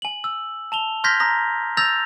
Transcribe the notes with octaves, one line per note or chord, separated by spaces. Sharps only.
G#5 F#7
E6
A5 F7 G7
C6 F6 G6 G#6 A#6 B6
A#5 D#6 A#6
D#6 E6 G6 A6 A#6 F7